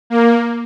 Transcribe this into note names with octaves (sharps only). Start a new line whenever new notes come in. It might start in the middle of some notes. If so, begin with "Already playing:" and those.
A#3